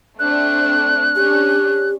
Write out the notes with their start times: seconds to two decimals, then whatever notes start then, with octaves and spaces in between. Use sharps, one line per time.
0.19 A3 C4 D4 F#6
1.15 C#4 D4 G4